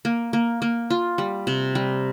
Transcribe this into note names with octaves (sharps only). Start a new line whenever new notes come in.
A#3
A#3
A#3
F4
G3
C3
G3